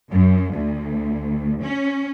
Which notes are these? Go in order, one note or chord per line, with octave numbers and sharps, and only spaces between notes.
F#2
D2
C#4